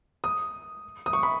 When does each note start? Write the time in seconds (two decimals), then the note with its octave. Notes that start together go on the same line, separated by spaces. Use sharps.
0.24 D#6
1.06 D#6
1.13 C#6
1.23 B5